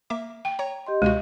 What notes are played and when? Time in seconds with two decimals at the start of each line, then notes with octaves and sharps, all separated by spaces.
0.10 A#3 E5 D6
0.45 G5
0.59 C#5 A#5
0.87 G4 D#5 C6
1.02 C#2 B2 G#3 F#4